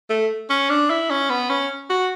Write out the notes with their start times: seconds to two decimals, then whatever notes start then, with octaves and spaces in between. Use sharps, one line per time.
0.10 A3
0.50 C#4
0.70 D4
0.90 E4
1.10 C#4
1.30 B3
1.49 C#4
1.90 F#4